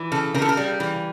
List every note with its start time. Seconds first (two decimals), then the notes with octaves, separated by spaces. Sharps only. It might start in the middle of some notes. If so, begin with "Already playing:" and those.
Already playing: E3
0.12 C#3 A4
0.34 C#3 A#4
0.42 A4
0.49 A#4
0.57 G3
0.80 E3